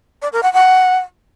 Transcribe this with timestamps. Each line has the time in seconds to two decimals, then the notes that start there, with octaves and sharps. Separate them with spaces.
0.22 D5
0.32 A#4
0.43 F#5
0.53 F#5